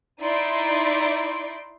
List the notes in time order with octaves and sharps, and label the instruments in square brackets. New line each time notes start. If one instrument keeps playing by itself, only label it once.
[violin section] D#4 E4 D5 C6 D7